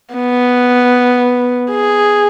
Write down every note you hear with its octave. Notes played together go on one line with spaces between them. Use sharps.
B3
G#4